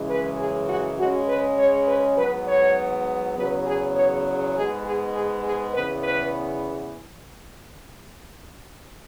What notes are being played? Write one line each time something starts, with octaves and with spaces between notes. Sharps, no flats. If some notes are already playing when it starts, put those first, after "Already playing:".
Already playing: F#2 C#3 E3 G#3
B4
G#4
F#4
C#3 G#3 C#4 F#4
B4
C#5
B4
G#2 F#3 B3 B4
C#5
E2 C#3 F#3 B3 B4
G#4
C#5
G#2 G#3 B3 G#4
G#4
G#4
G#4
E2 C#3 E3 B3 B4
B4